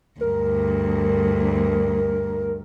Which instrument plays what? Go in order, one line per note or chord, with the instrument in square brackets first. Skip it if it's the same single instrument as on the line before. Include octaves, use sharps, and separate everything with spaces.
[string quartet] D2 G2 [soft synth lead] A#4